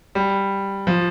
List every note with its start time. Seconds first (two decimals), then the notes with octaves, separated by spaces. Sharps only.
0.15 G3
0.87 F3